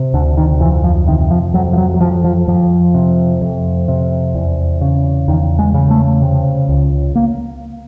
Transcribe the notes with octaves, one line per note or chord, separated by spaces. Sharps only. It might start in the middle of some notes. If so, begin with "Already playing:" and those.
Already playing: C3
D2 D3
D#3
F2 E3
F3
C3 D#3
F3
F2 F#3
F3
F#3
F#3
F2 F3
F3
F2 F3
C3
F2
C3
E2
C#3
E2 D#3
G#3
C#3
A3
C3
C#2
A#3